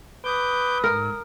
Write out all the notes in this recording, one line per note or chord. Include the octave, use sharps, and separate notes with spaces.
B4 D6 D#6 G6
G#2 A#4